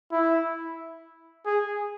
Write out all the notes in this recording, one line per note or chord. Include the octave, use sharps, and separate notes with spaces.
E4
G#4